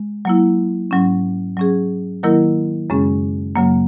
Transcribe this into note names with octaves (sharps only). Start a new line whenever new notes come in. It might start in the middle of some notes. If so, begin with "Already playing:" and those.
Already playing: G#3
F#3 A#3 E4
G#2 F#3 C#4
F#3 C#4 G#4
D#3 F#3 A#3 E4 A#4
F#2 C#3 G#3 C#4 G#4
F#2 C#3 F#3 A#3